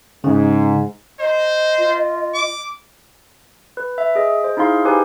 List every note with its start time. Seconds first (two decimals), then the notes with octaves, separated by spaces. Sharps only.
0.24 G#2 C#3
1.20 C5 D#5
1.79 F4
2.34 D6
3.77 B4
3.98 E5
4.16 G#4 D#5
4.44 C5
4.57 D#4 E4 G#4 F5 C6
4.85 D#4 G4 B4 C5 G#5